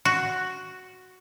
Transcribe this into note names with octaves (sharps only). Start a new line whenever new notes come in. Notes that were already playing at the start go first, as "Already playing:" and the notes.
F#4